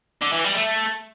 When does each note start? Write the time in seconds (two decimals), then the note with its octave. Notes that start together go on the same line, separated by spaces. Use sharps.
0.22 D3
0.33 E3
0.45 G3
0.55 A3